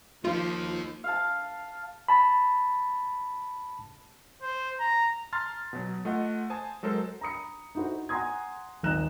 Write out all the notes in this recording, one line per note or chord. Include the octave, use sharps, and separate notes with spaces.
F3 A#3 D#4 F4
F5 A5
A5 B5
C5
A#5
A5 A#5 C6 F6 A6
B2 F#3
A3 F4 D#5 F#5
C5 G#5 A5 D#6
F#3 G#3 A4 A#4 C5
A#5 B5 D#6 C#7
D#4 E4 F#4 A4 C5
F#5 G#5 A#5 C6 D#6 G#6
D#1 G#1 D#5 A#5 F#6 E7